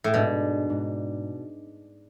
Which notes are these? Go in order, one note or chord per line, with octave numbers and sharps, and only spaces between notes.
A2
G#2 B2 G#3 D4
G#2 G#3 D4